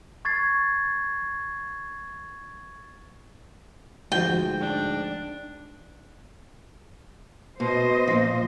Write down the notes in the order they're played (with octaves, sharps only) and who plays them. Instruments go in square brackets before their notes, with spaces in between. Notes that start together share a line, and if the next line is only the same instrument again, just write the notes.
[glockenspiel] C#6 G#6 A6 C7
[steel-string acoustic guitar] D2 F3 F#4 [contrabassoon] G#2 [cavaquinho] G5
[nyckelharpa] D4
[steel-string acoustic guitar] B2 [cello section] C5 D#5
[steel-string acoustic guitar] A#2 F3